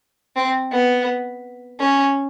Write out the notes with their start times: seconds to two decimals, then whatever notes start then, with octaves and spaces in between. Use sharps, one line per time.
0.36 C4
0.72 B3
1.80 C#4